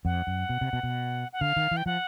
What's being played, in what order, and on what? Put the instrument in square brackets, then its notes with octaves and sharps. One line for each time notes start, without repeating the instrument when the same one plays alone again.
[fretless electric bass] F2 [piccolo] F#5
[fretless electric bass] F#2
B2
C3
B2
B2
[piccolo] F#5
[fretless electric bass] D3 [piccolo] F5
[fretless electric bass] D#3
E3
[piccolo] G5
[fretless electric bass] F3 [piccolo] F#5